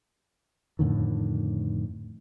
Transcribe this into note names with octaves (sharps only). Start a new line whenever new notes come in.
F2 A2 D3 D#3